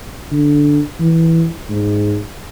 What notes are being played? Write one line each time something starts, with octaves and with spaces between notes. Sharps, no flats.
D3
E3
G#2